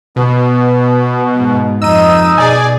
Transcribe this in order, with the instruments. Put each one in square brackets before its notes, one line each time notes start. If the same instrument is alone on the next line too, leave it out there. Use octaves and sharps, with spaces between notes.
[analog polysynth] B2 [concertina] B3
[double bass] G#2
[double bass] F2 [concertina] D#4 D#5 [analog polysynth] E6 D#7
[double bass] B2 [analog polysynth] G#4 D5 G#5